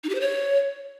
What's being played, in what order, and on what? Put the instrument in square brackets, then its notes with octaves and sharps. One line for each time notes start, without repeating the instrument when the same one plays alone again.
[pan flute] D#4
G4
C5
C#5